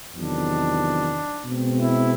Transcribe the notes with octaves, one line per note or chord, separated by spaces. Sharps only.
E2 C3 D#3 F#3 D4
B2 G#3 C4
E4